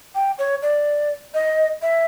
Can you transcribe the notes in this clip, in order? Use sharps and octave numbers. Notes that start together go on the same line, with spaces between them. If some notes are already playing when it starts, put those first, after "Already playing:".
G5
C#5
D5
D#5
E5